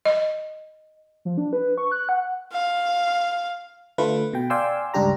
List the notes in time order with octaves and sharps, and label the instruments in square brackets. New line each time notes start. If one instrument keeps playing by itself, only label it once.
[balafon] D#5
[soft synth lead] F3
D4
B4
C#6
F#6
F#5
[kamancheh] F5
[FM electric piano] D3 A3 F4 B4
B2 G5
D5 F5 G5 G#5 C6 E6
C#2 G2 D4 G4 A#5